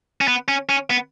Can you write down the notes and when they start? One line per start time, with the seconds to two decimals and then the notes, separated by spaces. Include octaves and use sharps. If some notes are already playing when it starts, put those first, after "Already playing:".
0.21 C#4
0.28 B3
0.48 C#4
0.69 C#4
0.90 B3